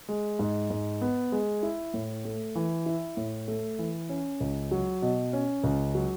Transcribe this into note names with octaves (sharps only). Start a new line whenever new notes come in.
G#3
G#2
G#2
B3
G#3
E4
A2
A3
E3
E4
A2
A3
E3
C#4
C#2
F#3
B2
C#4
C#2
F#3